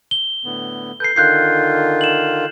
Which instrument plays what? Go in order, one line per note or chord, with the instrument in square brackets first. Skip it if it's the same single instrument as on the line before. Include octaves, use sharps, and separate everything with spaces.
[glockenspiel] G7
[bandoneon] A2 D3 B3
[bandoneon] A4 B4 [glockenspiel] G6 C7
[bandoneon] D3 D#3 F4 [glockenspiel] F#6 G6 C7
[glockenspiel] E7 F#7